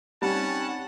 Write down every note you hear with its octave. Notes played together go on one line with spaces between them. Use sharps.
G3 C4 C#4 D#4 G4 F#5 A5